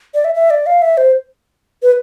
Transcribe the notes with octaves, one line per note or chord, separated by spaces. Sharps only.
D5
E5
E5
D5
F5
E5
C5
B4